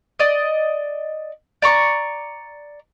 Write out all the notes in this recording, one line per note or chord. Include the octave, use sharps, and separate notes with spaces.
D5 D#5
D5 A#5 C#6